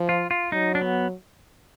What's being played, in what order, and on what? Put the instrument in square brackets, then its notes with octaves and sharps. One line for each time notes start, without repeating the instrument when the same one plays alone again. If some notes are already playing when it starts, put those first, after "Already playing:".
Already playing: [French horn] F3
[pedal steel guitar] F4
F4
[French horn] F#3 [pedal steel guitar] D#4
[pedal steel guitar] D4
B3